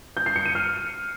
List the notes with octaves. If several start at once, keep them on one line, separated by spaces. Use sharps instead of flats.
G6
C7
C#7
D#7
F6